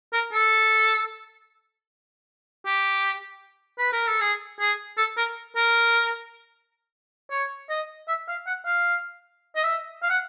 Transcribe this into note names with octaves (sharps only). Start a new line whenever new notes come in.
A#4
A4
G4
B4
A#4
A4
G#4
G#4
A4
A#4
A#4
C#5
D#5
E5
F5
F#5
F5
D#5
E5
F5
F#5